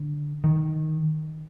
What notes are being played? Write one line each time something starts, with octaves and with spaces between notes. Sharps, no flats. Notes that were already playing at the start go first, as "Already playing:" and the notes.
Already playing: D3
D#3